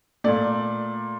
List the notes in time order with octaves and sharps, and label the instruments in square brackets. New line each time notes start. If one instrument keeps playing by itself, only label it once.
[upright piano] A#2 A3 D5